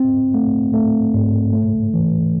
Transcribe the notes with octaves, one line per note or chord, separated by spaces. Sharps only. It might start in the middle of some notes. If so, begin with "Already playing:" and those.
Already playing: C4
A3
A3
G#2
A3
E3